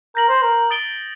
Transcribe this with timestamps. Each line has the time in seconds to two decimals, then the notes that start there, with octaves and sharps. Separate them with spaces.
0.15 A#4 G6 A#6 F#7
0.29 C5
0.42 A#4
0.70 D#6 A6 D7 G7